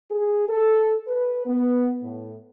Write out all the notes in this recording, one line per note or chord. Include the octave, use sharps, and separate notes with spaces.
G#4
A4
B4
B3
A2